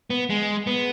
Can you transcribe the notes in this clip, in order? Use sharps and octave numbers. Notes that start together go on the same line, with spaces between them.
B3
G#3
B3